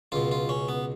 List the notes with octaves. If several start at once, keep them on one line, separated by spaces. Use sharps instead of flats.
C#2 B2 F4
F4
C#4
B3